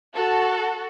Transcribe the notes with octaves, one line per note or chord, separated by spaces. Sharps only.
F#4 A4